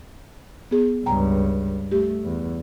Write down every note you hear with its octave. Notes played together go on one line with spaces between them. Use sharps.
B3 G#4
C#2 G2 G5 A#5
A3 G4
E2